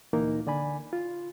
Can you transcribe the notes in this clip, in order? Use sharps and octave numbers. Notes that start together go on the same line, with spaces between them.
D2 A#2 E3 A#3 D#4 A#4
D3 D5 G#5 B5
F4